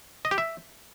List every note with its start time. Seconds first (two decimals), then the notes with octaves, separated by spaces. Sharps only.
0.25 D#5
0.31 G4
0.38 E5